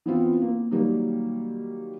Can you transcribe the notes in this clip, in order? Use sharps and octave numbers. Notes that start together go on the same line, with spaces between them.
E3 B3 C4 F4
A#3
D#3 F#3 G3 A#3